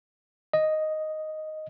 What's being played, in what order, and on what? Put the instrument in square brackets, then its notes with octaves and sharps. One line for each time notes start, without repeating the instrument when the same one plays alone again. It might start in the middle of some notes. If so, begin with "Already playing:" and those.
[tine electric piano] D#5